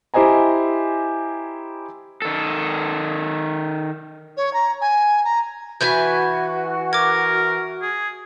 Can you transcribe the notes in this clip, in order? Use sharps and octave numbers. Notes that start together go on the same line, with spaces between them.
E4 G4 C5 D#5 G#5 A#5
D#3 A4
C#5
A#5
G#5
A#5
E3 F#4 B4 E5 G#5 G6
A#4 D6 G#6
G#4